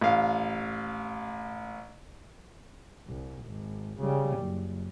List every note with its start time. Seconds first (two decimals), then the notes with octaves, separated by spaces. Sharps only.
0.01 A1 F5
3.08 C2
3.46 G#1
4.00 C#3 G3
4.38 F#1